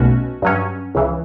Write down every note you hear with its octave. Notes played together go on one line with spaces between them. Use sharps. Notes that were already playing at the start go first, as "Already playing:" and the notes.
Already playing: B1 B2 A3 C#4 F#4
G2 F#3 C#4
C#2 C#3 E3